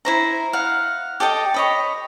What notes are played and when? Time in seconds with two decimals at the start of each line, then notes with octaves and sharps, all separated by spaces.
0.05 E4 C5 A#5
0.53 F5 F#5
1.20 G4 A4 D#5 G5
1.54 C#5 D#5 B5